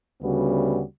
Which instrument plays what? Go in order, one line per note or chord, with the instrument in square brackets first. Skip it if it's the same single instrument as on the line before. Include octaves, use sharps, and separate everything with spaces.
[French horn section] D2 C#3 G3 B3 F#4